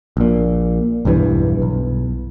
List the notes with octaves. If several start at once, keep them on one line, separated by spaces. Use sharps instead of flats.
A#1 A#2
B1 E2 G2 E3
B1